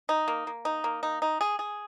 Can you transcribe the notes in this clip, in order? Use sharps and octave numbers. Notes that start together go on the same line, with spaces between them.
D#4
A#3
A#3
D#4
A#3
D#4
D#4
G#4
G#4